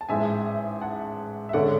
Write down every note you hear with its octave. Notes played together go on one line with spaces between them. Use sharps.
A5
A1 G#2 G#3 E5 G#5
F#5 A5
E5
G#1 D3 G#3 C#4 D5 F#5